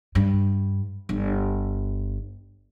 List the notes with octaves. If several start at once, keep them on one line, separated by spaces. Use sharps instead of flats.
G2
G1